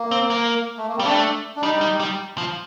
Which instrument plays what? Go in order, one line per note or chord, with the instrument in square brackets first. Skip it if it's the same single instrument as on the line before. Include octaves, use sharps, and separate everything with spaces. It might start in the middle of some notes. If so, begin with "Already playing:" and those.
Already playing: [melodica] A#3
[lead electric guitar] C4
A#3
[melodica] A3
A#3
[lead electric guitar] G3 [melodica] C4
[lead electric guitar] A3 [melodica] D4
[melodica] D4
[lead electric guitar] G3 [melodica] D#4
[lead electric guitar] G3
G3
F3